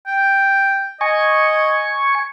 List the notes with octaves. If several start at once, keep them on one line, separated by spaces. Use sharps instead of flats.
G5
D#5 G#5 C#6